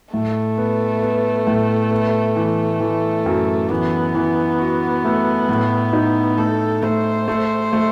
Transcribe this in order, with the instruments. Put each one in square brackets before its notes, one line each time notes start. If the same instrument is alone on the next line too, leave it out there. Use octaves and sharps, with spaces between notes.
[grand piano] A2 [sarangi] A3
[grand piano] B3
B3
A2
B3
E3
E3
F#2
[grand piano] E3 [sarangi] B3
[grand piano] E3
F#4
A3
A2
D#4
[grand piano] A3 [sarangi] A4
[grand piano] A3 [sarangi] C5
[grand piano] A3
A3